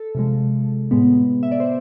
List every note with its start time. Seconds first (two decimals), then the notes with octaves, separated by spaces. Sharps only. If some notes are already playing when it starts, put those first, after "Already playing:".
Already playing: A4
0.15 C3 F3 G#3
0.91 A2 G#3 B3
1.43 E5
1.52 D5
1.60 C5